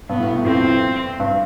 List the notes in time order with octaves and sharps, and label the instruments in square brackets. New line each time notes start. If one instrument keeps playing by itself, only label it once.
[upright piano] G2 [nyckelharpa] B3
[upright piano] A2
B2
A2
[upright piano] F2 [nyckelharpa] C4
[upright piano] G2